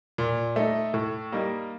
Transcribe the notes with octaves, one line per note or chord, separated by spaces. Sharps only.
A#2
A3 D#4
A2
G3 A#3 D#4